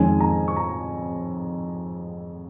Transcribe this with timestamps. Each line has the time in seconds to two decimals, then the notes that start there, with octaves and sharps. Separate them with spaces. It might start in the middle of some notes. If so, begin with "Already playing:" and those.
Already playing: F2 D#3 G#3 C#4 G#5
0.21 A#5
0.48 C#6
0.56 A#5